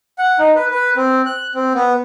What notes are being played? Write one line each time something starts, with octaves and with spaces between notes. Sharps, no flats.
F#5
D#4
B4
B4
C4
F#6
C4
B3